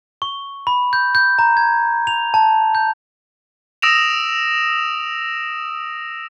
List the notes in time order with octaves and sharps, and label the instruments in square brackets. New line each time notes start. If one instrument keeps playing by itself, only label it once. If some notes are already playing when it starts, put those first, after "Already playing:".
[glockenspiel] C#6
B5
G6
G6
A#5
G#6
F7
A5
G6
[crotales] D#6 E6 A#6 D7 E7 F7